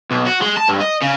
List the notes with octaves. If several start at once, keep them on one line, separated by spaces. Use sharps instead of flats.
B1
F#4
G#3
A5
G2
D#5
C#3